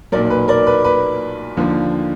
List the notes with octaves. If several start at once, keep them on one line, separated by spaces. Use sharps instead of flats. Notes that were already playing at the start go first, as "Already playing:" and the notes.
B1 A#2 F#3 A#4 D5
B4
A#4 D5
B4
B4
D#2 D3 F3 A#3